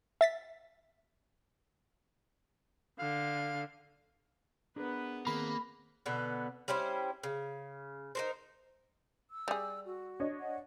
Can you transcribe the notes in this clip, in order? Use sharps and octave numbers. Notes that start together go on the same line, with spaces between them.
E5 A6 B6
D3 F5
B3 D4 G#4 A#4 B4
D#3 A#3 C4 G#4 B5
B2 D3 B3
G3 C#4 E4 C5
C#3
D#4 A#4 C5
E6
G3 G#4
F#4
D4 C#5 D#5
F#5